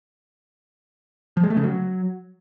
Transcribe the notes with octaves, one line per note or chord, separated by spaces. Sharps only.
F3
G#3
A3
C#3
F#3